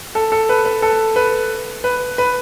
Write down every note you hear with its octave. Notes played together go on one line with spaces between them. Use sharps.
A4
A4
B4
B4
A4
B4
B4
B4